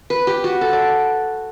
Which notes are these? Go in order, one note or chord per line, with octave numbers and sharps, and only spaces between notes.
B4
G4
F#4
A4
D5